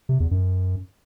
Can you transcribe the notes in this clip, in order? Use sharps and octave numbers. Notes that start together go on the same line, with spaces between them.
C3
E2
F#2